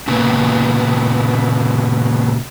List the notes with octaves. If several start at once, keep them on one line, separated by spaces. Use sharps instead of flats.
A#2 C#3 B3